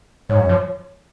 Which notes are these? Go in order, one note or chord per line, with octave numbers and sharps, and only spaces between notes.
G#2 C#5
F#2
F3